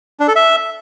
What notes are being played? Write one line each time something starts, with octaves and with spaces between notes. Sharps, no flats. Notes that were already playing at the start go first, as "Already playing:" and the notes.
D4
A4
E5